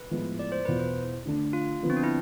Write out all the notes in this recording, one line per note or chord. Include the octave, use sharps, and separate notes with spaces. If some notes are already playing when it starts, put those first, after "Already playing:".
Already playing: B4
A2 F3 G#3 B3 E4
D5
C5
E2 B2 B3 F4 B4
C5
D3 A3 D4
F4
D3 F3 B3
C4
D4
E4